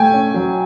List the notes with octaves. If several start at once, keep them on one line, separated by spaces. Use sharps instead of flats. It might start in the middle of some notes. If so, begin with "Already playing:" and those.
Already playing: A3 G5 G#5
C#4
F#3